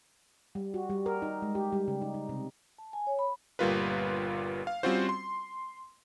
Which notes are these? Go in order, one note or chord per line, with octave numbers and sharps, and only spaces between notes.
G3
F#4
G3
A#4
D#4
G#3
G4
G3
C#3
D#4
D#4
C3
A5
G#5
C#5
B5
G1 A#2 G3 F4 A#4 B4
F5
G3 C4 C#4 F4 F#4 C5
C6